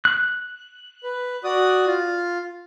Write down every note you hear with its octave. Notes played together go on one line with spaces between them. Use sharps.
F#6
B4
F#4 D5 D#6
F4